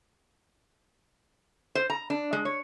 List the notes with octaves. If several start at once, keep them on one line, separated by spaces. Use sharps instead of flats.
C5
A#5
D4
G#3
C#5